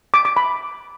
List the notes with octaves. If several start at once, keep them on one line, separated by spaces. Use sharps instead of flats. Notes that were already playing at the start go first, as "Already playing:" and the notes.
D6
D6
B5